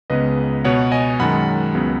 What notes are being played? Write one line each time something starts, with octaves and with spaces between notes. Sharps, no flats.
C#2 C#3 G#3 B3 B4 D#5
B2 B3 C#5 F#5
D#5 G#5
F#2 D#3 G#3 F#5 B5
C#2 C#3 F#3 B3